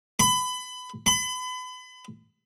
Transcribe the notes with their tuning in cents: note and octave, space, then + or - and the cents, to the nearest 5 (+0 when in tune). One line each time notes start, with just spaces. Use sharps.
B5 +25
B5 +35